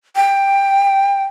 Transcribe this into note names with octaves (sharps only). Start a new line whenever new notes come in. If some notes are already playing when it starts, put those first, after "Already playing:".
G5